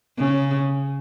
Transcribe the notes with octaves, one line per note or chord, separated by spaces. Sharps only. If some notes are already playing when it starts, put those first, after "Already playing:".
C#3